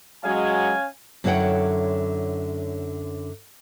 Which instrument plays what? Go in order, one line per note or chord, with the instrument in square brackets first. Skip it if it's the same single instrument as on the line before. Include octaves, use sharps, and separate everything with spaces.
[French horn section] F#3 G#3 [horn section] C#4 F5 G#5
[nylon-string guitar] F#2 D3 E4 C#5 F#5 G5